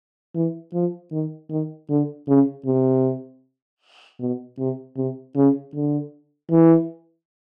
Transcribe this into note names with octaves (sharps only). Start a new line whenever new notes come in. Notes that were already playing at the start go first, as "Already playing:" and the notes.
E3
F3
D#3
D#3
D3
C#3
C3
B2
C3
C3
C#3
D3
E3